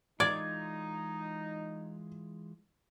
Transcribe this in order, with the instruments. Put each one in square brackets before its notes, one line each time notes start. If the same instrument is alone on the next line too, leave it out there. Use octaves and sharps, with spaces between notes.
[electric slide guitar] E3 G#3 F4 [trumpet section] D#4 [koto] D5 [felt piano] G#6